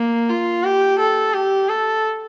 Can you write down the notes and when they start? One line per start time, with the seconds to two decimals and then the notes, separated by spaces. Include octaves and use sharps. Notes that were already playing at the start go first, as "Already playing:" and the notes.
Already playing: A#3
0.29 F4
0.64 G4
1.00 A4
1.34 G4
1.69 A4